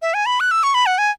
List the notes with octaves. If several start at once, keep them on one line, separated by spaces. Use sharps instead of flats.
E5
G#5
B5
F#6
E6
C#6
B5
F#5
G#5